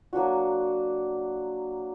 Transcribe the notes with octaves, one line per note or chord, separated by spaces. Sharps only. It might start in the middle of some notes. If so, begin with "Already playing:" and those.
F#3 A#3 D4 F#4